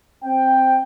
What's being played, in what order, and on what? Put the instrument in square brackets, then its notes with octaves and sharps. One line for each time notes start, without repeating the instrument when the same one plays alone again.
[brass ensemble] C4 G5